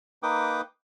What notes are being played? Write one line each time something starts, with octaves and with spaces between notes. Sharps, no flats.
A#3 D#4 B4 G5 D6 D#6